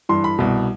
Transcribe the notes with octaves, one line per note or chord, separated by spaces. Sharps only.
G2 E3 C6
B5
C2 B2